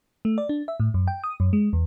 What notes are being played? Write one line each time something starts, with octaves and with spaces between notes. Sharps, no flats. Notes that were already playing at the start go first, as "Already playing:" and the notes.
A3
D5
D4
E5
A2
F#2
G5
D#6
F#2
G#3
E2